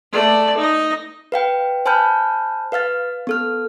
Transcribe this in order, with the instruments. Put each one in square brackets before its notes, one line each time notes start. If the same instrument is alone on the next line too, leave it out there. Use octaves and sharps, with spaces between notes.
[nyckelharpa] A3 D5
D#4 D#5
[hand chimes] B4 F5 G5
C5 G#5 A5 B5 F6 G6
B4 F5 F6 A6
B3 A4 F6